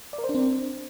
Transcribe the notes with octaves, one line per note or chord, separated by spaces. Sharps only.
D5
A#4
C5
D4
C4